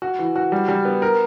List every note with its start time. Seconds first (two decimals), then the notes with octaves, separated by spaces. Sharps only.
0.02 F#4
0.19 E3
0.36 F#4
0.52 G3
0.68 G3
0.85 B3
1.02 A#4